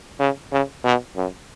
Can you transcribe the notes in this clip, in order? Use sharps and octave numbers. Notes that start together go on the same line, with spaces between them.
C#3
C#3
B2
F#2